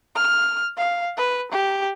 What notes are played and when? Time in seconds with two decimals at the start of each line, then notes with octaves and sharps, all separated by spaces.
0.16 F6
0.77 F5
1.17 B4
1.52 G4